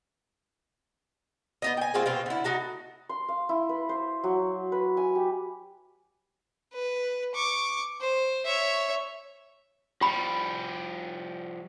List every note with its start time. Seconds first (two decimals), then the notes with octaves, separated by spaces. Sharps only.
1.62 B3 D#4 D#5
1.77 G5 G#5
1.94 G#3 A#3 C4 F4
2.06 B2 C4 F4
2.26 D3 E4
2.44 A3 D#4 F#4 A5
3.09 C6
3.28 F5
3.49 E4
3.69 B4
3.89 C5
4.24 F#3
4.72 B4
4.97 G#5
5.15 G4
6.73 B4
7.35 C#6 D6
8.01 C5
8.45 C#5 E5
10.01 F3 G3 G4 B5